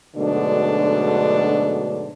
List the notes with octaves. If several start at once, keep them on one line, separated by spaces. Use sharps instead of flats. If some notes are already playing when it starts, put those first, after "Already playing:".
G#2 B2 D3 F#3 A3 D4